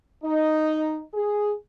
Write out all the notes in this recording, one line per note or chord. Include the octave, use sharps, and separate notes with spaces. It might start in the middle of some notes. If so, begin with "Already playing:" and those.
D#4
G#4